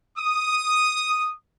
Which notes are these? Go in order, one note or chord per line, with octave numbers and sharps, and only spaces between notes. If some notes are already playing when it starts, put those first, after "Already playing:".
D#6